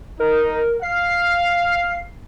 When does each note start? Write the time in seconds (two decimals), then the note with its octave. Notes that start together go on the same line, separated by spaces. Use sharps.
0.20 D#4 A#4
0.83 F5 C7